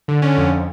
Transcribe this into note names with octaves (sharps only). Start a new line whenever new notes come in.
D3
D3 C#4
F2